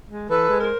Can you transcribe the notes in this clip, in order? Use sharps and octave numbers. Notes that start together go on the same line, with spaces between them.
G#3
E3 A4 B4
G#3
A#4 C5